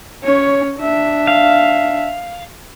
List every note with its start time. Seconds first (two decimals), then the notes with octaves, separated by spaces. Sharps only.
0.23 C#4 C#5
0.79 D4 E5
1.27 F5